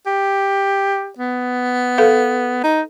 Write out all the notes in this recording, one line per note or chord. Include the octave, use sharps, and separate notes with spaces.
G4
B3
A4 B4 F5
D#4